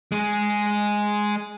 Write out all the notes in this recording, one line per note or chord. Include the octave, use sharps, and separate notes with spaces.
G#3 G#4